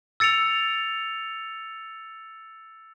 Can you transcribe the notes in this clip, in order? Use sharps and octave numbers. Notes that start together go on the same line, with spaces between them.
E6 A6 C#7 D7 F7